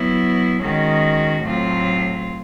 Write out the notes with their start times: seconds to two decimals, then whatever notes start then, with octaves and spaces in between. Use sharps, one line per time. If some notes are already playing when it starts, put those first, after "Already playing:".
Already playing: F#3 B3 E4
0.60 D#3 G#3 C#4 F#4
1.42 A2 F#3 A3 C4 F4